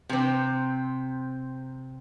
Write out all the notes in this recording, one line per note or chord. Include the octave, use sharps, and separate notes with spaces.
C3 C4